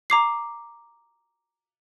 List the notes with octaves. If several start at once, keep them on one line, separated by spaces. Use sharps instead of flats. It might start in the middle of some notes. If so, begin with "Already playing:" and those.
A#5 D6 C7